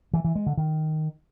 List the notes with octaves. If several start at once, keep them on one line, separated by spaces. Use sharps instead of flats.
E3
E3
G#3
D3
D#3